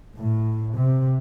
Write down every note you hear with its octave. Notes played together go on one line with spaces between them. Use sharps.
A2
C3